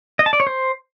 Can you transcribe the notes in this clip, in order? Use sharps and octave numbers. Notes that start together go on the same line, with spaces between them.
D#5
A5
D5
C#5
C5